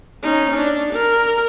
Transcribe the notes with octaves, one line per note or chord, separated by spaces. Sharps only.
C#4 D#4
D4
A#4